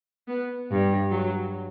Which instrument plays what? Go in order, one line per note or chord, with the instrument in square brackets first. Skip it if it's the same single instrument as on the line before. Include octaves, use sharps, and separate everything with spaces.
[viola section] B3
[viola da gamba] G2 [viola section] G3
[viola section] F#3